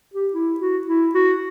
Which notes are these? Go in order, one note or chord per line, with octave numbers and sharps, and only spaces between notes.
G4
E4
F#4
E4
F#4